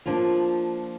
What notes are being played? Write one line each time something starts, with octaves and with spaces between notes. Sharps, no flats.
F3 A#3 D4 F4